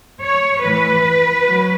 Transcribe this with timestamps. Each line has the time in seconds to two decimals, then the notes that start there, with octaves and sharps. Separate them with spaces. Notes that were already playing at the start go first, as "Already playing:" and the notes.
0.21 C#5
0.62 A2 E3 B4
1.47 F#3